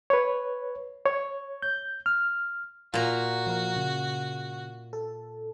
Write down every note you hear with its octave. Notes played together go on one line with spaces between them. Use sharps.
B4 C#5
C#5
G6
F6
A#2 F4 F#4 A#5
F3 A#3 A#4
C#3
A4